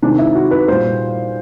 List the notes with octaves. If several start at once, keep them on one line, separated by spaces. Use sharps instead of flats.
C3 D#3 G#3 D4
E4
F#4
B4
A#2 G3 C5